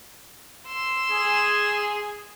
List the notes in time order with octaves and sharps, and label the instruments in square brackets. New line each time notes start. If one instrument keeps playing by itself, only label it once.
[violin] C6 E6
[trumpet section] G#4